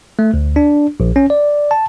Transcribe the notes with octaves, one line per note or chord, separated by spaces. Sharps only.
A3
D2
D4
A#1
C#4
D5
A5